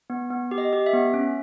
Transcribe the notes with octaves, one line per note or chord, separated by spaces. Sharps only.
B3
B3
G4
D#5
G4
E5
B3
C#4